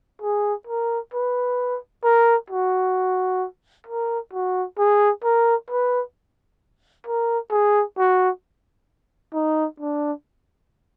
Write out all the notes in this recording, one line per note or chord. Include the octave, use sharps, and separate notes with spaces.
G#4
A#4
B4
A#4
F#4
A#4
F#4
G#4
A#4
B4
A#4
G#4
F#4
D#4
D4